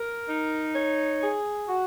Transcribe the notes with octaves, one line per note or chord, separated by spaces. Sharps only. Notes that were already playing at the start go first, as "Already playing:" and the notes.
Already playing: A#4
D#4
C#5
G#4
F#4